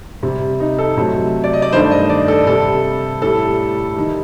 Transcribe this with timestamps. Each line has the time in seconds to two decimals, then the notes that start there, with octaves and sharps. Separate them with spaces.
0.23 C3 G3
0.60 D#4
0.79 A4
0.97 C3 F#3 A3
1.44 D5
1.53 D#5
1.62 D5
1.72 G2 D#3 A3 C5
1.91 D#5
2.10 D5
2.28 A4
2.47 C3 G3 A4
3.22 A2 G3 A4
3.96 D#3 G3